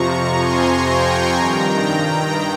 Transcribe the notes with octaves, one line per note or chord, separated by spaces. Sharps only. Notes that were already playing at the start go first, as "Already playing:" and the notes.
Already playing: F2 C3 F3 A#5 C#6
G#5 C6
G5 A#5
G2 D#3